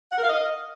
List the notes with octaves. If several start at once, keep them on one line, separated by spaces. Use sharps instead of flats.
F#5
A#4
F5
D#5